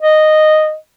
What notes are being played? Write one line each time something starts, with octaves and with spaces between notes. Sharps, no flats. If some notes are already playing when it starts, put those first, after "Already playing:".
D#5